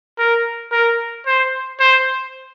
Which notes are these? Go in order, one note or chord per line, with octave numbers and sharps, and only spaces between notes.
A#4
A#4
C5
C5